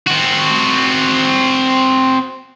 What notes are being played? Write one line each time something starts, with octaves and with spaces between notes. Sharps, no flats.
C4 F#4